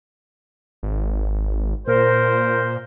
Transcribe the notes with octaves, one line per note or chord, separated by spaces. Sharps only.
G#1
A#2 A#4 C5